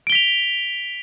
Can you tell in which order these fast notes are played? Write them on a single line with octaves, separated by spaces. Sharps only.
D7 G7 B6 F7